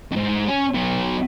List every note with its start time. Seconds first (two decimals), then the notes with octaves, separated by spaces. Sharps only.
0.11 F2 G#2
0.48 C#4
0.75 F#3 B3